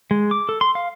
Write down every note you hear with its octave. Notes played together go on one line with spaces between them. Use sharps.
G#3
D6
A4
C6
F5